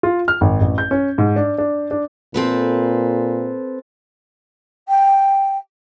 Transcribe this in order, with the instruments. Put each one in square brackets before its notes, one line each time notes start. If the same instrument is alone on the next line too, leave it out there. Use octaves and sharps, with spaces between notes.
[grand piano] F4
F6
G#1
A1
G6
C#4
G#2
D4
D4
D4
[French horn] A#2 [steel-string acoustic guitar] C4 A4 B4
[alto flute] G5